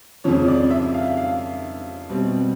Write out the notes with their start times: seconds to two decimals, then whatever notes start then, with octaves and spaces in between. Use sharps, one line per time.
0.24 F2 C#3 F3 C#5
0.48 D5
0.70 E5
0.94 F5
1.17 F5
2.09 B2 G3 C4